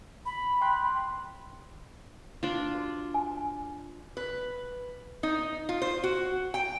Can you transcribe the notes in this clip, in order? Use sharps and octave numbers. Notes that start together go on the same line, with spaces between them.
B5
G5 C6 F#6
D4 F4
F#4
G#5
B4
D#4
F4
C5
F#4
G5